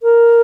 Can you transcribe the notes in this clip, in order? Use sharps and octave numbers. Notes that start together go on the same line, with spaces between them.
A#4